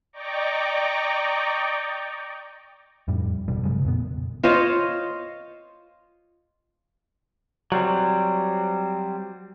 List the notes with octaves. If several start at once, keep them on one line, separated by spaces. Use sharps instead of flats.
D5 D#5 G5 A#5 C#6 D6
F2 A2 G3
A1 G2 B2 G3
G2 C#3 F#3 G#3
F2 A#2 B3
F4 C5 C#5 D#5
F#3 G3 C4